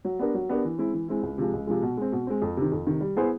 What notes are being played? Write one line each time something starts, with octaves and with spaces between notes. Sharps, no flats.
F#3
B3 D4 G4 A#4
F#3
B3 D4 G4 A#4
E3
G#3 C4 E4
E3
G#3 C4 E4
C#2
C3 F3 G#3
C#2
C3 F3 G#3
B2
G#3 C4
B2
G#3 C4
F2
C3 D#3
F2
C3 D#3
G3
B3 E4 G#4 C5